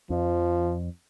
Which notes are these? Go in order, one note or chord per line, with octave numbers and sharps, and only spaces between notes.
F2 F3